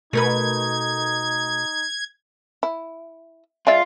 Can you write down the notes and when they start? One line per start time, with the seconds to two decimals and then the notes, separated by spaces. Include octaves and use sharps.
0.13 B2 A3 D#4 A#4 B4 G#6
2.63 E4
3.67 G#3 F4 D5 E5